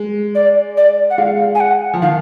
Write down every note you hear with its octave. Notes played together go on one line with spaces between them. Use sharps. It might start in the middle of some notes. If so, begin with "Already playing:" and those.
Already playing: G#3
D5
D5
F#5
G#3 F5
G#5
F#5
F3
D#3 F5